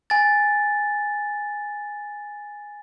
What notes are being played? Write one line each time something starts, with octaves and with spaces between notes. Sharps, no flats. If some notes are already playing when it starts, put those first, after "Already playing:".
G#5 A6